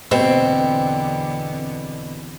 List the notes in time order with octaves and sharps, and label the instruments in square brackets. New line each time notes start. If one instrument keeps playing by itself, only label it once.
[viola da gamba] E2 D3 B3 [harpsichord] B2 [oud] C4